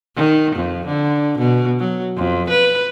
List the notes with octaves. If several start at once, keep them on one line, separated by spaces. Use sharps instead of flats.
D#3
F2
D3
B2
F#3
F2
B4